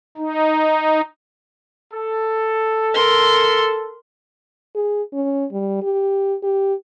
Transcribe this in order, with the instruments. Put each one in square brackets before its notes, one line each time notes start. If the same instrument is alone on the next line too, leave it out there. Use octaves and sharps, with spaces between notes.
[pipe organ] D#4
[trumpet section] A4
[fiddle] A#4 C6
[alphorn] G#4
C#4
G3
G4
G4